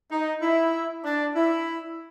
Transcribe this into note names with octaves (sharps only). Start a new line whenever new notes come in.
D#4
E4
D4
E4